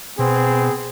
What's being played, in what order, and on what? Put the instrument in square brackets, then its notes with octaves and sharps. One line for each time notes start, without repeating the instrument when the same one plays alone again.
[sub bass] B2 [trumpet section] B3 C4 G#4